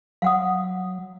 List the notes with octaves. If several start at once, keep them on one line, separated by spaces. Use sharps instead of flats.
F#3 F5 F#5 D#6